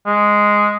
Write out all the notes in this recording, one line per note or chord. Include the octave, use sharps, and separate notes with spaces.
G#3